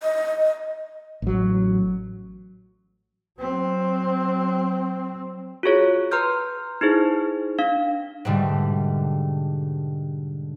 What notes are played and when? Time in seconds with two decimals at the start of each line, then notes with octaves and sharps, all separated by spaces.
0.03 D#5
1.22 A1 F#3
3.39 F#3 C4
5.63 F4 F#4 G#4 C#5
6.11 B4 A#5 C6 F6 G6
6.81 D#4 E4 G#4 C5
7.59 D4 F5
8.25 G#2 B2 D3 G3 A3